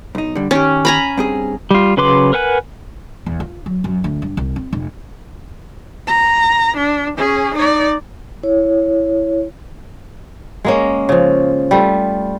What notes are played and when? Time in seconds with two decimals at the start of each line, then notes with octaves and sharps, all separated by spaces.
0.15 B1 D#4
0.35 D3 G3
0.51 D#3 C#4 G4
0.85 G#5 A#5 B5
1.17 G2 C4 G#4
1.71 G3 F4
1.97 C#3 F#3 B4 C6 D6
2.33 A#4 B4 F#5 G#5 F#6
3.26 E2
3.40 F4
3.66 F#3
3.84 F#2
4.04 D2
4.22 G2
4.37 C2
4.56 C4
4.73 F1
6.07 A#5
6.77 D4
7.17 C#4 G#4
7.54 D#4 D5
8.43 E4 C#5
10.64 G#3 A#3 C#4
11.09 C#3 F3
11.71 G3 A3 F4